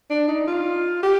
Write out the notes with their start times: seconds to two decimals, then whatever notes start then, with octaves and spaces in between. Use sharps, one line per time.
0.10 D4
0.28 D#4
0.47 F4
1.03 G4